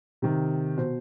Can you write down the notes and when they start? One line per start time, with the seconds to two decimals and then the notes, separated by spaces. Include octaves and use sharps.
0.22 C3 D#3
0.77 B2 C5